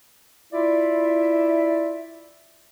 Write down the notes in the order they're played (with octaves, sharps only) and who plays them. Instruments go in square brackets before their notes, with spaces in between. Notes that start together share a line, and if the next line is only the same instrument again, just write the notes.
[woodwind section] E4 F4 D5 E5